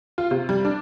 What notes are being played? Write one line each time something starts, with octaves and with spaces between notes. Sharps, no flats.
F4
C3
G3
D4